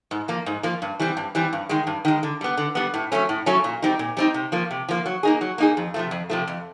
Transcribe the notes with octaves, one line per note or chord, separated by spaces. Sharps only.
G#2
F3 A#3
G#2
F3 A#3
G2
E3 G3 C4
G2
E3 G3 C4
G2
D#3 G#3
G2
D#3 G#3
D3
G3 B3
D3
G3 B3
A2
F#3 A3 C#4
A2
F#3 A3 C#4
A#2
G3 C4 D#4
A#2
G3 C4 D#4
C3
F3 A#3
C3
F3 A#3
F#3
A#3 D#4 G#4
F#3
A#3 D#4 G#4
F2
C3 F3 A3
F2
C3 F3 A3
F2